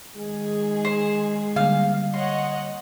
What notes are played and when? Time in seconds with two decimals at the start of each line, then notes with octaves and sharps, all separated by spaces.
0.16 D#3 G#3 G#4
0.85 C5
1.56 D3 G3 A#3 F5
2.14 C#5 D#5 F#5 C6